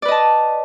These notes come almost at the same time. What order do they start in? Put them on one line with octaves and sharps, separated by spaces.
D5 B4 D#5 A5